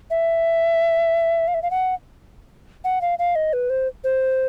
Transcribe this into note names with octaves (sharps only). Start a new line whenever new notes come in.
E5
F5
E5
F5
F#5
F#5
F5
F5
D#5
B4
C5
C5